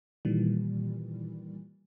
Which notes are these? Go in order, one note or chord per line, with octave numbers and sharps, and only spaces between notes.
A#2 D#3 E3 G3